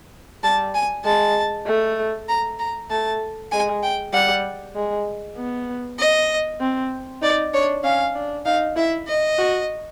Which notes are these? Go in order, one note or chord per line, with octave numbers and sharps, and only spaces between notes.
G3 A5
G#5
G#3 A5
A3
A#5
A#5
A3 A5
G#3 G#5
G5
G3 F#5
G#3
B3
D#5
C4
D#4 D5
D4 C#5
C#4 F5
D4
D#4 F5
E4 E5
D#5
F#4